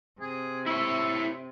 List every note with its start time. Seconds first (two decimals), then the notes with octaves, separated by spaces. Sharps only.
0.21 C3 G#4
0.66 E4 C#5 E5